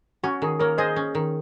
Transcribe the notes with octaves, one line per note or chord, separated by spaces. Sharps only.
C#4 F#4
D#3 G#4
A#3 A#4 C#5
G#4 C5 D#5
C#4
D#3